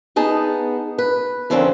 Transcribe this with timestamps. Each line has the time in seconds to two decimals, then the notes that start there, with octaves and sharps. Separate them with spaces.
0.16 B3 D#4 G#4 A5
0.98 B4
1.50 F2 D3 D#3 F3 C4 C#4